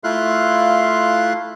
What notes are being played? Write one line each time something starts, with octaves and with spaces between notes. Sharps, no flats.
A3 E4 F4 F5 C6 F#6